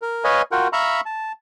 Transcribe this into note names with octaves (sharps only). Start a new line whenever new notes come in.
A#4
B4 C#5 D#5 F5 G#5
F4 F#4 A#4 F#5 G5
E5 F5 A#5 B5 C#6 E6
A5